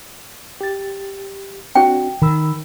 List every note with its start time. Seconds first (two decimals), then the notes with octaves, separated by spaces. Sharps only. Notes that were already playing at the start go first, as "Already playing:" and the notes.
0.61 G4 A6
1.75 C4 D4 F#4 G5
2.22 D#3 A#4 B5 E6